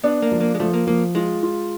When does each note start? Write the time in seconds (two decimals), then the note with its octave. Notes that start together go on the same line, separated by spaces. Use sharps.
0.04 B3 D4
0.22 A#3
0.32 F3
0.41 A#3
0.55 G#3
0.60 F3 A3
0.74 A#3
0.87 F3 A#3
1.15 G#3 F4
1.43 F4